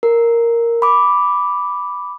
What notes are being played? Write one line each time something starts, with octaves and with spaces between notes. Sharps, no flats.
A#4
B5 D6